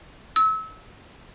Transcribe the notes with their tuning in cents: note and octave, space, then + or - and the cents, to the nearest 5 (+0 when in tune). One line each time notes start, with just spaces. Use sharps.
E6 -30